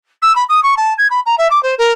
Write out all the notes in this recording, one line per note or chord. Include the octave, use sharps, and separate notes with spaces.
E6
B5
D#6
C#6
A5
G#6
B5
A#5
E5
D6
C5
A#4